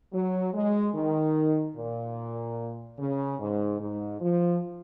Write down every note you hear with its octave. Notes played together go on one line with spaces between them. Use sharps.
F#3
G#3
D#3
A#2
C#3
G#2
G#2
F3